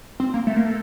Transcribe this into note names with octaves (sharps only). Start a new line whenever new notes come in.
C4
A#3
A3
A#3
A3